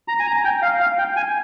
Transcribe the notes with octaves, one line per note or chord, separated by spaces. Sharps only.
A#5
G#5
A#5
G5
F5
F5
G5
G#5